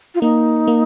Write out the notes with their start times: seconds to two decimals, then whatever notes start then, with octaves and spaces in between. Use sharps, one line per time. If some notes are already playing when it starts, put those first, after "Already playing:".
0.15 F4
0.22 A#3 D#4
0.67 A#3